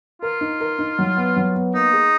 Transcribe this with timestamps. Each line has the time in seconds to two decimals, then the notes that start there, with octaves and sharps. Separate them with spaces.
0.22 F4 A#4
0.41 D#4
0.61 A#4
0.79 D#4
0.99 F#3
1.17 B3
1.36 F#3
1.55 B3
1.74 A#3 D#4
1.93 G#4